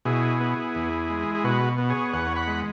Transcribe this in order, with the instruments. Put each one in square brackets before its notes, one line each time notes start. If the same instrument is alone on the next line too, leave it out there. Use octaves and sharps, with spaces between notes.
[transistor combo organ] B2 E4 G#4
B3
E2
G#3
G#4
B2 F#4 B4
B3
G#4 C#5
E2 C#5 F#5
F#5 B5
G#3